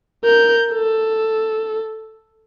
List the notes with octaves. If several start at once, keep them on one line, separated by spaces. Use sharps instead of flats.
A#4 G6
A4